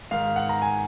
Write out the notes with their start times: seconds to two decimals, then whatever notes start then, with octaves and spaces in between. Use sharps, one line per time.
0.11 G#2 D#3 F5
0.36 F#5
0.49 A#5
0.62 G#5